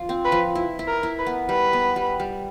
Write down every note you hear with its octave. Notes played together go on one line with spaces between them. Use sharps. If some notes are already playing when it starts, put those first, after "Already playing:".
Already playing: F3 F4
C4
B4
F3
E4
E4
A#4
E4
B4
B3
G3 B4
B3
G3
G3